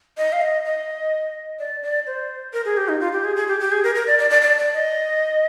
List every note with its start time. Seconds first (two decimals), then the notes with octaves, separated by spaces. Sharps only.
0.18 D#5
0.33 F5
0.41 D#5
0.65 D#5
1.59 D5
1.83 D5
2.07 C5
2.53 A#4
2.65 G#4
2.77 G4
2.89 D#4
3.00 F4
3.13 G4
3.24 G#4
3.36 G#4
3.48 G4
3.60 G4
3.72 G#4
3.84 A#4
3.95 A#4
4.07 D5
4.19 D5
4.30 D5
4.42 D5
4.58 D5
4.74 D#5